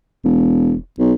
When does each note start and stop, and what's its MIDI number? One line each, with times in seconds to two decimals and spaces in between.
0.25 0.74 28
0.99 1.13 35